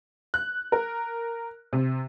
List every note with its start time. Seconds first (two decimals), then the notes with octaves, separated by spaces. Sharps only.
0.34 F#6
0.72 A#4
1.73 C3